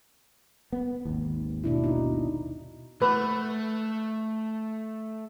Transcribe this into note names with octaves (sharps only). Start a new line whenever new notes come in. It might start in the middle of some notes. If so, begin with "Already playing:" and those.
B3
G#1 D#2
B2 D4 E4
D#4
A3 B4